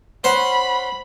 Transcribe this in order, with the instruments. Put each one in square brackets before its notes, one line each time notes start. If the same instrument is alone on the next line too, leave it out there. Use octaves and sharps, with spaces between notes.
[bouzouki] C#4 F#5 [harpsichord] C5 [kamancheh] B5